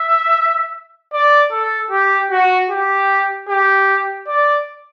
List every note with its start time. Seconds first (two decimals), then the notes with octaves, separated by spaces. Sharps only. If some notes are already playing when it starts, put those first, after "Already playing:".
Already playing: E5
1.13 D5
1.51 A4
1.91 G4
2.31 F#4
2.70 G4
3.48 G4
4.27 D5